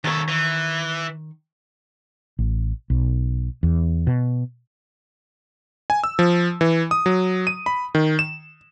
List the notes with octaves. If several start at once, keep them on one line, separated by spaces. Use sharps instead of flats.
D#2 D#3 A4 C#5
E3
A1
B1
E2
B2
G#5
E6
F3
E3
D#6
F#3
D#7
B5
D#3
E7